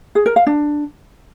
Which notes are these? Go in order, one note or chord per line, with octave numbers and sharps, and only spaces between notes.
G#4
A#4
F5
D4